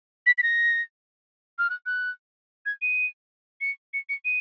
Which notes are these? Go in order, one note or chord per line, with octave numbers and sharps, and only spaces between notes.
B6
B6
A#6
F6
F#6
F#6
G#6
D#7
C#7
C#7
C#7
D#7